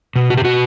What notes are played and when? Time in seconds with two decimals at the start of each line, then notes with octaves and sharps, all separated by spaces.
0.16 B2
0.30 F#4
0.37 G4
0.45 B2 F#4